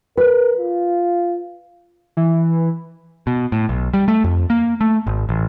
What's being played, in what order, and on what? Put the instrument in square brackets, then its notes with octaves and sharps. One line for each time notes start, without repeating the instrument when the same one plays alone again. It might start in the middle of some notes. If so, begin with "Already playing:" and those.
[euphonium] A#4 [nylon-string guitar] B4
[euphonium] F4
[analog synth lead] E3
[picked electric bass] B2
A2
B1
G3
A3
F2
A#3
A3
G#1
A1